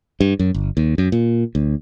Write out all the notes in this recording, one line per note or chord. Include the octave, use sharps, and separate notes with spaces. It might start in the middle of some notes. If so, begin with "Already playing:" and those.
G2
F#2
G1
D#2
F#2
A#2
D2